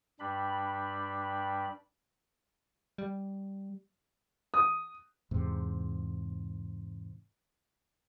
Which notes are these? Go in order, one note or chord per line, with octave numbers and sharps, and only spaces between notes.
G2 G3 D4 B5
G3
D#6
E2 G#2 C3